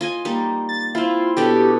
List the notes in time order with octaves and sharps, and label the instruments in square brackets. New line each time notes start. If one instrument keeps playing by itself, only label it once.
[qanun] F4 D#5 G#5
G3 A#3 D#4
[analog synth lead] A6
[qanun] C4 E4 [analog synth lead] F4
[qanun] B2 D4 A4 [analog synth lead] G4